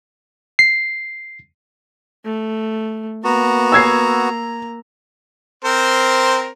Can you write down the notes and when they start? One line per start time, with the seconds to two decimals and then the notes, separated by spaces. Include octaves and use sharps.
0.59 C7
2.25 A3
3.24 A#3 B3 F#4 A#5
3.72 E6 G#6 C7
5.64 C4 A#4 C5